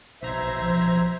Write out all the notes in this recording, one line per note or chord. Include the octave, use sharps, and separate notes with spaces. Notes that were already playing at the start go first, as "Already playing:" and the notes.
B1 C5 E5 A#5 G#6
F3